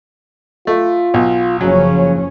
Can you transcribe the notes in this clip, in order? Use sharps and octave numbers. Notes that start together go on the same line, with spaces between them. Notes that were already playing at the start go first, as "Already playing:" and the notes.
A3 F4
B1
F#1 C#3 F3 F#3 C#4